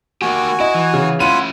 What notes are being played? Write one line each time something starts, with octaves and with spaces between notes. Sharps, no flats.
A#3 F#4 G4 G#5
E4 D#5
E3
C#3
C#4 E4 F4 F#5 B5 D#7